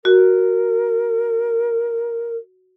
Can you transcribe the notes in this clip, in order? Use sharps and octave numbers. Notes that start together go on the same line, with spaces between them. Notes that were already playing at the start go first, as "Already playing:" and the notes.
F#4 A#4